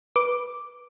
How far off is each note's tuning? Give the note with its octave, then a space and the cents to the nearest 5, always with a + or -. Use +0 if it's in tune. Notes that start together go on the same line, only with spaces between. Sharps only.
B4 -15 D6 +0